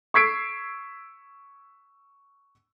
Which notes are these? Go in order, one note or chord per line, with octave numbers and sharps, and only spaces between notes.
C#6 E6 G#6 B6 C7 D7